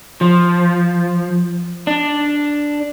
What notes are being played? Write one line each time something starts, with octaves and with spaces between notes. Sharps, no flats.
F3
D4